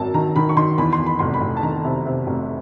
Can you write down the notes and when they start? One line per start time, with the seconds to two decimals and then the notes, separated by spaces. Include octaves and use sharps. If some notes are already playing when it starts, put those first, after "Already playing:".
Already playing: G#1 F#2 A5
0.14 D#3 A#5
0.36 D#3 B5
0.49 C#6
0.57 D#3 C6
0.78 E2 B5
0.93 C6
0.99 E2
1.06 B5
1.19 F1 C6
1.34 B5
1.42 F1
1.57 A5
1.63 D#3 A#5
1.85 C3
2.06 C3
2.27 F1